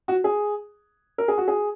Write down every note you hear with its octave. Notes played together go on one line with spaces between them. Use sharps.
F#4
G#4
A#4
G#4
F#4
G#4